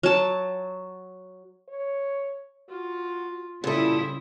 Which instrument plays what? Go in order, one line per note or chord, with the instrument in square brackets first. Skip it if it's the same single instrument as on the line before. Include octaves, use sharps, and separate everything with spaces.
[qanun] F#3 A5
[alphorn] C#5
[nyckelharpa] F4 [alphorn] F#4
[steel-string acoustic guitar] A#2 A4 [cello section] C#3 E4 [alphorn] G3 [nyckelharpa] C5 D#6